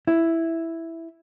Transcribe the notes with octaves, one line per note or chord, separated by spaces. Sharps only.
E4